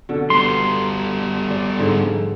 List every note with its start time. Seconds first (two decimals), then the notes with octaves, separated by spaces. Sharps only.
0.09 B2 D3
0.30 G3 B3 C6
1.50 D5
1.79 G#2 D3